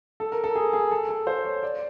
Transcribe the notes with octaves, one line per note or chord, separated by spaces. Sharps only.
A4
A#4
A4
G#4
G#4
A4
A4
C5
C#5
D5